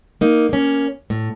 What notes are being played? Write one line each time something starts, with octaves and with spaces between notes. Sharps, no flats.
A#3 D#4
A#3 C#4
A2